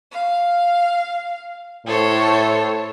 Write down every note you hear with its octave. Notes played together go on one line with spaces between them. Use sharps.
F5
A2 A4 C5 C#5